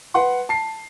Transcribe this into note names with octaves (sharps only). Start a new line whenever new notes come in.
B4 F#5 C6
A5 C7